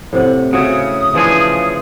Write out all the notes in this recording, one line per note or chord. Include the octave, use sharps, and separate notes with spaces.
A2 C3 F#5
C#3 F#4 C#5 E5 D#6
C#3 E3 F3 D4 E4 G#4